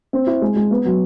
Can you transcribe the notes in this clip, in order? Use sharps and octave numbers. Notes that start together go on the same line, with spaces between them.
C4
E4
G#3
G#3
B3
F#3